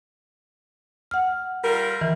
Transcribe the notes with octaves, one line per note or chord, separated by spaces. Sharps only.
F#5 F6
G3 F4 A#4
D#3 E3